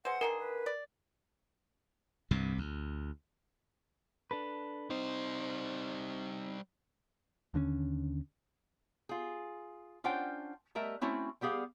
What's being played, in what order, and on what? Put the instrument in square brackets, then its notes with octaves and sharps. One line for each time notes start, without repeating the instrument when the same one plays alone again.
[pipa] G#3 C5 [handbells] B4 [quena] F#5
[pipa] D3 D#3 G#4 [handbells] A#4
[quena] B4
[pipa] D5
[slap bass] C2 G2 C3
D2
[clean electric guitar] D4 A4 B4
[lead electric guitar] G3 C5 [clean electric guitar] C4 D#4
[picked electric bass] D#2 D3 C4 C#4
[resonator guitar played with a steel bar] F4 G#4
C#4 D4 F4 C5 F#5 G5
G3 A3 A#4 D#5 E5
A3 C4 C#4 E4 F#4
G3 B3 G4 G#4 F5